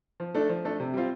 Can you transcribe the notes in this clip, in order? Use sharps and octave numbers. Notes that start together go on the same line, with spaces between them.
F3
A3 D4 A4
F3
A3 D4 A4
C3
G3 C4 F4